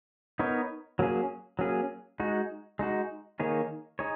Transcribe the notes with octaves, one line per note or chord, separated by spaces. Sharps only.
B3 D#4 A#4 C#5
F#3 A#3 C#4 G#4
F#3 A#3 C#4 G#4
G#3 D#4 F#4
G#3 D#4 F#4
D#3 A#3 D#4 G#4 C#5
D#4 G#4 C#5